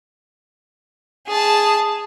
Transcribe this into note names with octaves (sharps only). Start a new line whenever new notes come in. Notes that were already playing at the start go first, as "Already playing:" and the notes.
G#4 A5